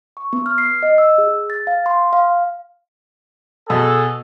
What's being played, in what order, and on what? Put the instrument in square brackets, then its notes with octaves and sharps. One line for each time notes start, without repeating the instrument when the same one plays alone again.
[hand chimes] C#6
B3
F6
C7
D#5
E6
G#4
A6
F5
C6
F5
[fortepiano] B2 [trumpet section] G#4 A4